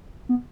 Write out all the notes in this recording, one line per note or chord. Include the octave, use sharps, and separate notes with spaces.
B3